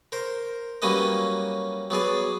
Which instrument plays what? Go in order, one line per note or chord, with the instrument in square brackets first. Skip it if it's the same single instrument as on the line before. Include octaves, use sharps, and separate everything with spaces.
[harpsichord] A#4 C5
F#3 G3 A#3 C#4 B4 D#5
F#3 B3 G#4 D5